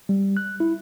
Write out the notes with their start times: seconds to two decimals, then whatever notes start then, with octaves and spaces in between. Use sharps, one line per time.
0.09 G3
0.37 F#6
0.60 E4